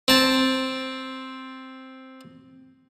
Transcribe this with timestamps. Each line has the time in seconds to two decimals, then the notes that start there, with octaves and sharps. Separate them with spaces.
0.08 C4 A5